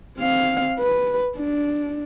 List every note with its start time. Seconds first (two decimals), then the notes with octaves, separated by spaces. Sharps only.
0.17 C4 F5
0.80 B4
1.37 D4